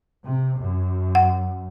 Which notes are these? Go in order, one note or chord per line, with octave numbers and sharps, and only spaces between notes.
C3
F#2
F#5